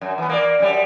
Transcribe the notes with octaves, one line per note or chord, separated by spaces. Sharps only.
F#2
E3 B3
A#3 D5
F#2 G3